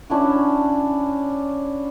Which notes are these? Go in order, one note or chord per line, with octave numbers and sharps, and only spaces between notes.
C#4 D4 E4 F#4